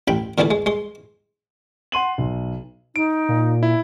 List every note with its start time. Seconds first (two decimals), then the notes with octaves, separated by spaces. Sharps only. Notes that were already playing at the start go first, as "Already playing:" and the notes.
0.08 A1 G5 B5
0.38 A#2 D3 E3 A3 E4 A4
0.51 G#3
0.66 G#3 C6
1.92 F#5 C6 D#7 F#7
2.18 B1
2.96 D#4 D7
3.29 A#2
3.63 E4